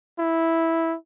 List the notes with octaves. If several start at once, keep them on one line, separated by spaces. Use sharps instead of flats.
E4